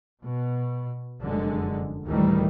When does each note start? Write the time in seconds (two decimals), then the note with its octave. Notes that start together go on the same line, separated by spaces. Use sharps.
0.24 B2
1.22 F1 F#2 D3 G#3
2.06 D2 A2 D#3 E3 G3 A3